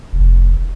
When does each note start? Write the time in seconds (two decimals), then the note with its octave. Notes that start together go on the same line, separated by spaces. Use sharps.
0.13 F1